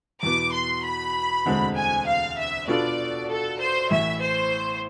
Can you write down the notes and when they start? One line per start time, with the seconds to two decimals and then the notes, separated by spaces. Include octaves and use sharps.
0.23 E2 B2 B3 D6
0.53 C6
0.84 B5
1.46 E1 D2 D3 G#3 C4
1.76 G#5
2.07 F5
2.37 E5
2.68 B2 B3 D4 F4 A4 D5
3.29 A4
3.60 C5
3.90 A1 A2 E3 E5
4.21 C5